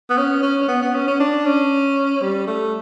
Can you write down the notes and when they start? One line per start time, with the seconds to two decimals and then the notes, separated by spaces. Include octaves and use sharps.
0.10 B3
0.18 C#4
0.43 C#4
0.63 C#4
0.68 B3
0.82 B3
0.95 C#4
1.08 C#4
1.20 D4
1.46 C#4
2.22 G3
2.47 A3